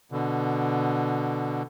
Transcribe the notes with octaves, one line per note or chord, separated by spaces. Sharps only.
B2 D3